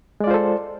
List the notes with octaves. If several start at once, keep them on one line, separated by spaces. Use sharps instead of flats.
G#3 F4 A4 C5 D5